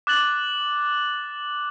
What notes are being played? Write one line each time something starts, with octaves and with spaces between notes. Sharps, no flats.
D6 F#6 A6 F#7